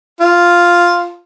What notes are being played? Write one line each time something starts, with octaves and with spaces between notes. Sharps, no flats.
F4